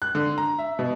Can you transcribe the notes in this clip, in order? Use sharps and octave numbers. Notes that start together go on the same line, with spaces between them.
F#6
D3
A#5
E5
B2